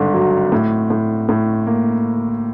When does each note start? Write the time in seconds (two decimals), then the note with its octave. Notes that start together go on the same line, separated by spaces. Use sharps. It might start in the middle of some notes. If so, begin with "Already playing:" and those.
Already playing: G#1 G2 D3
0.14 F#3
0.52 A2
0.90 A2
1.29 A2
1.67 A#3